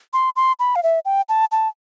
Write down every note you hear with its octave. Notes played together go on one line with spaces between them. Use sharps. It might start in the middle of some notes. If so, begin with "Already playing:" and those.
C6
C6
B5
F5
E5
G5
A5
A5